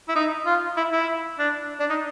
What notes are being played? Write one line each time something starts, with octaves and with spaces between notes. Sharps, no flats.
E4
D#4
F4
E4
E4
D4
D4
D#4